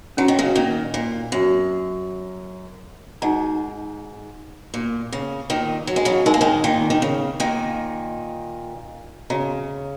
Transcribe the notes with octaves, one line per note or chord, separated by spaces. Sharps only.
F#3 C#4 F#4 C#5 F#5 A#5
D#3
C#3 F#3
A#2 D#3
A#2
F#2
G#2 D#4 F#4 D#5 F#5 A#5
A#2
C#3
A#2 D#3
F#3
G#3
C#3 F#3
G#3 D#4 A#4 D#5 G#5
A#3
D#3 G#3
A#2 D#3
D#3
C#3
A#2 D#3
C#3 F#4 D#5 A#5